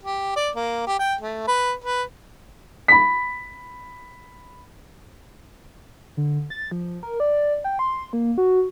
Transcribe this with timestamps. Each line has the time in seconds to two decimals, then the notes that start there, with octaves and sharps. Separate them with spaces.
0.03 G4
0.36 D5
0.56 A#3
0.87 G4
0.99 G5
1.21 A3
1.47 B4
1.84 B4
2.88 B5 B6
6.17 D3
6.50 A6
6.71 F3
7.03 A#4
7.20 D5
7.64 G5
7.79 C6
8.13 A#3
8.38 F#4